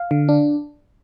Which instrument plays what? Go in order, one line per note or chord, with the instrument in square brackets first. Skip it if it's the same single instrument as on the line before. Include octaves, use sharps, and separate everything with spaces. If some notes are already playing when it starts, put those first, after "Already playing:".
Already playing: [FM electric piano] F5
D3
D4